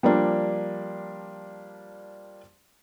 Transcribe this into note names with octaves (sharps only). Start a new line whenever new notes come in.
F3 G3 A#3 D4